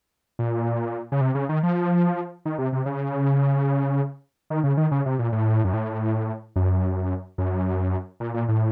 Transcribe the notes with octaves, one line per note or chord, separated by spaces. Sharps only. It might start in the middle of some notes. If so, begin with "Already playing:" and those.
A#2
C#3
C3
C#3
D#3
F3
D#3
C3
C3
C#3
D#3
C#3
D#3
C#3
C3
A#2
A2
F#2
A2
F#2
F#2
A#2
A#2
A2